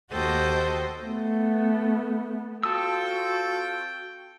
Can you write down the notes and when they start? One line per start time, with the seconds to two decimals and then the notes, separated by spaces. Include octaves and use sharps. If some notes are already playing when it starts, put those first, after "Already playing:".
0.11 D#2 F#4 A4 C5 D#5 G5
1.03 A3 B3
2.63 C4 F4 F#4 A4 G5 A5 D#6 E6